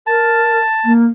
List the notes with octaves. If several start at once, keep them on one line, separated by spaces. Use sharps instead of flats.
A#4 A5
A#3